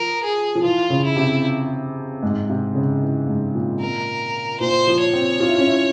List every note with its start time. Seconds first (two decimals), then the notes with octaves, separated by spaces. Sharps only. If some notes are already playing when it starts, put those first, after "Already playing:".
Already playing: F3 A#4
0.24 G#4
0.55 F3
0.63 E3 F4
0.90 C#3
1.04 E4
1.16 C3
2.23 G#2
2.50 C3
2.75 C#3
3.02 E3
3.28 G#2
3.55 A#2
3.81 A#4
4.60 A#2 C5
4.87 F3
5.00 C#5
5.13 C4
5.40 F4
5.49 E4
5.58 C#4
5.67 E4